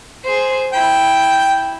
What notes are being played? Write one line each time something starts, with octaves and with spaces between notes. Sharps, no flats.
G#4 C5
E4 G5